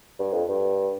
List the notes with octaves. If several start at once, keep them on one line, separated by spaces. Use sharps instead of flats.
G2
F2
G2